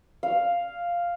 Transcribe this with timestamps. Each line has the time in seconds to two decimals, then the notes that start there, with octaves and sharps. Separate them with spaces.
0.23 F5